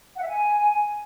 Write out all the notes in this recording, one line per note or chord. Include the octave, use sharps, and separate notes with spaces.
F#5
E5
G#5